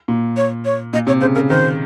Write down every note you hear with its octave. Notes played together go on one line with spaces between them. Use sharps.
A#2
C#5
C#5
A#2 D#5
C3 C#5
C#3 C5
C#3 A#4
D#3 C5